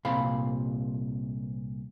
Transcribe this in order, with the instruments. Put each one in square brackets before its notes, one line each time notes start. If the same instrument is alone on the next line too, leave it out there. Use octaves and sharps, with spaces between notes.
[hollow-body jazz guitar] C2 A#2 C4 F5 B5